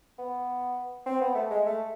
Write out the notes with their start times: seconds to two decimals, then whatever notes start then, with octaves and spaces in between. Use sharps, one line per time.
0.18 B3
1.06 C4
1.21 B3
1.35 A3
1.51 G#3
1.66 A3